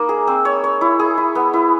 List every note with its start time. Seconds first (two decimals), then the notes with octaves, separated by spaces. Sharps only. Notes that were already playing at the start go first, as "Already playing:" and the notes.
Already playing: A#3 D#4
0.09 G#4
0.27 C4
0.45 C#5
0.64 C#5
0.81 E4
0.99 G#4
1.17 E4
1.35 B3
1.53 E4